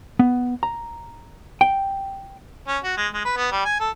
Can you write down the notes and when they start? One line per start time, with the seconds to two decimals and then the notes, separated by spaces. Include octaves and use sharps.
0.19 B3
0.63 A#5
1.61 G5
2.68 C#4
2.84 F#4
2.97 G#3
3.14 G#3
3.25 B4
3.37 B3
3.52 G3
3.65 G#5
3.80 A4